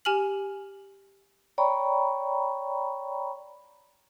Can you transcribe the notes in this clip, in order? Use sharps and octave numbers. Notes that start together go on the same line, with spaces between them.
G4 G#5 F6 F#7
C#5 D5 G5 A#5 B5 C#6